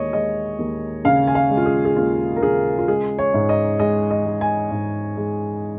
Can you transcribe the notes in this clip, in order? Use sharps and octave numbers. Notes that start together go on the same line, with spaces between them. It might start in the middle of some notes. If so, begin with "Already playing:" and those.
Already playing: D#2 G#3 C#5 D#5
G#3 D#5
D#2
C#3 F5
G#5
F5
G#3
F4
G#4
G#4
D#2 F4
A#4
C#3 G#4
F4
G#3 G#4
C#5
G#2
D#5
G#3 D#5
D#5
G#3
G#5
G#2
G#3